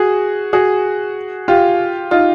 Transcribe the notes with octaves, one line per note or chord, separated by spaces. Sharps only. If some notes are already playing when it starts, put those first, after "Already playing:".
Already playing: F#4 G#4
F#4 G#4
F4 G4
D#4 F4